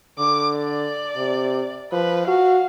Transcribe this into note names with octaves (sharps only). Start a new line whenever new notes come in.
D3 D6
D5
C3
F3 B4
F#4 F5